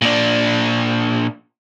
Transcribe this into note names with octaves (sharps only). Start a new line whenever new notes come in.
A#2 D4